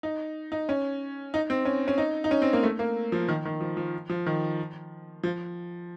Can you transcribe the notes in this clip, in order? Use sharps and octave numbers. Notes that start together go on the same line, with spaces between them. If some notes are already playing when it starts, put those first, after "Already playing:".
D#4
D#4
C#4
D#4
C4
C#4
C#4
D#4
D#4
C#4
C4
A#3
A3
A#3
F3
D#3
D#3
F3
F3
F3
D#3
F3